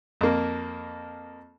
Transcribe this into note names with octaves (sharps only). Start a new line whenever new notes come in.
F2 A#3